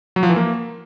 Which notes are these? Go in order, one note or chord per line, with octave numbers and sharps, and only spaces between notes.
F#3
F3
E3
A#3